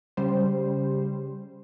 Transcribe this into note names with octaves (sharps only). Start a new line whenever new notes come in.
C#3 G3 C5